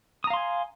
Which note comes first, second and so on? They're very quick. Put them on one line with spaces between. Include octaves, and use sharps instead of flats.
D#6 A#5 F5 C6 G#5